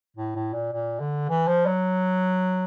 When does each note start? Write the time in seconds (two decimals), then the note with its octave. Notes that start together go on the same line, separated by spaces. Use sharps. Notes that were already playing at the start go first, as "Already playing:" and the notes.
0.17 A2
0.36 A2
0.53 A#2
0.73 A#2
1.00 D3
1.29 E3
1.48 F3
1.66 F#3